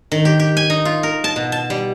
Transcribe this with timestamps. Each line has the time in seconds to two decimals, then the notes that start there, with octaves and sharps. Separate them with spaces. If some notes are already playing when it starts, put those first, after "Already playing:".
0.12 D#3
0.25 G4
0.40 G4
0.57 G#5
0.70 D#4
0.85 F4
1.03 A#4
1.24 A5
1.36 B2
1.52 A5
1.70 G3